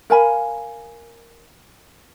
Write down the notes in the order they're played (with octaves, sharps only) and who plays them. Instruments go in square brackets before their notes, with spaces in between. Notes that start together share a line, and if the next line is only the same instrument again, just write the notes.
[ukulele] A#4 F5 G#5 B5